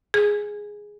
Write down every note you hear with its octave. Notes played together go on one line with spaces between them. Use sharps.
G#4